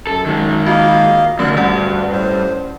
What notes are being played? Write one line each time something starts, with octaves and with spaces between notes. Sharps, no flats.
F#2 A4
D#3 G#3
A#3 F4 F#4 D#5 F5
E2 B2 D3 A3 C#4 A#4 F#6
D2 G2 C#4 D5 F#5
A2 C5